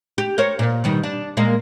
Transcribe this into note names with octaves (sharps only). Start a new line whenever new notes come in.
G4
A#4 C5 C#5
A#2
B2 D#3 G3
D4
A#2 G#3 A#3